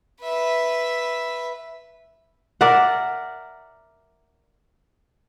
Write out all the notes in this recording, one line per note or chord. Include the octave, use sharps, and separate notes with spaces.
B4 E5
A#4 D5 E5 F#5